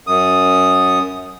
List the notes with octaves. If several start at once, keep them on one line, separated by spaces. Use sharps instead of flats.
F#2 D#6